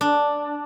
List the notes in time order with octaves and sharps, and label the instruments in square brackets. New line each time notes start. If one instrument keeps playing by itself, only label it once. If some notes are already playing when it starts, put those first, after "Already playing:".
[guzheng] D4